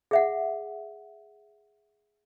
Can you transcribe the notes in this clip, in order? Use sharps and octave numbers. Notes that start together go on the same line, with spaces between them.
G#4 E5 F#5